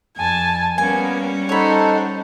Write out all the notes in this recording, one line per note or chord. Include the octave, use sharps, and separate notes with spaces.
F2 G#5 A5
G3 A#3 B3 C#4 G#5
D#4 A4 C5 C#5 F#5 B5